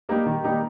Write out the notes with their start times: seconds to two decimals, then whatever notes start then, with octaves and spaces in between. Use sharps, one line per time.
0.09 G3 A#3 D#4 G4
0.26 D#3
0.43 G3 A#3 D#4 G4